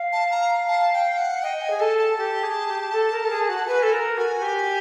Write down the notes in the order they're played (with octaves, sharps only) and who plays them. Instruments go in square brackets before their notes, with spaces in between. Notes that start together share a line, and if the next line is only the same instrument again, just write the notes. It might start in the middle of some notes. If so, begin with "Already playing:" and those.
Already playing: [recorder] F5
[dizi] A5
A#5
A5
G5
F#5
[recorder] D#5 [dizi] G5
[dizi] G#5
[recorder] G#4
[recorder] A4 [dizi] A5
[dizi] A5
[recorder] G4
G#4
G4
A4
A#4
A4
G#4
F#4
[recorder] B4 [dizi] G#5
[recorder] A4
A#4
[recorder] F#4 [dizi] G#5
[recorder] G4